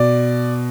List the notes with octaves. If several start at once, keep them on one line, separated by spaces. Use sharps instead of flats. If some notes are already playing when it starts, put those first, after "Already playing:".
Already playing: B2 D5